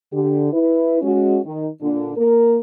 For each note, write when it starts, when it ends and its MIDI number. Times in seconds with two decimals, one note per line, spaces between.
0.12 0.48 50
0.12 0.48 67
0.53 0.99 64
0.53 0.99 71
1.01 1.39 56
1.01 1.39 61
1.01 1.39 66
1.45 1.67 51
1.81 2.12 46
1.81 2.12 50
1.81 2.12 62
2.17 2.59 58
2.17 2.59 70